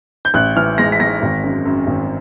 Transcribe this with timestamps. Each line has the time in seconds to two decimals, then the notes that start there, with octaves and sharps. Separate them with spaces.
0.25 G6
0.34 A1 F#6
0.56 E3 F6
0.78 G#3 A#6
0.92 B6
1.00 G#3 A#6
1.22 G#1
1.44 F#2
1.65 F#2
1.87 G#1